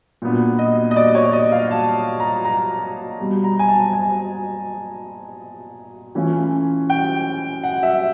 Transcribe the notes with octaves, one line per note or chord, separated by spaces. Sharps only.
A#2 F#3 B3 D4
D#5
D#5
D5
C#5
D#5
F5
A5
A#5
A#5
B2 G3 B3
A#5
G#5
A5
G#5
E3 A3 C#4 F4
G5
F#5
E5